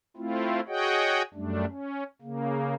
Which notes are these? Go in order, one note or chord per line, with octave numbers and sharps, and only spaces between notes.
A3 C4 E4 F4
F#4 G#4 C#5 D#5 F#5 G5
F#2 G3 A3 D4
C#4
C#3 A#3